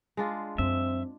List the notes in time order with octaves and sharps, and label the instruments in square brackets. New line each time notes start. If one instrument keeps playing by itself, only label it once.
[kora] G#3 D4 F4
[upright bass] F#2 [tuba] C4 [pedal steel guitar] E5